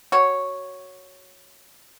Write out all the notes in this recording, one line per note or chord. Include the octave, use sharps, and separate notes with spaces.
F#4 C#5